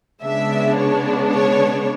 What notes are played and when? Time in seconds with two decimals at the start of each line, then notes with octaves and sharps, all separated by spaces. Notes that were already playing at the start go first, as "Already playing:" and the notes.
0.23 C#3 G#3 B3 D4 E5
0.76 C#5
1.30 C#5